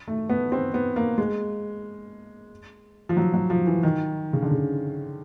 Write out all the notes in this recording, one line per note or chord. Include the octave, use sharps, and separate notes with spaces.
A3
B3
C4
B3
A#3
G#3
F3
F#3
F#3
F3
E3
D#3
C#3
D3
C#3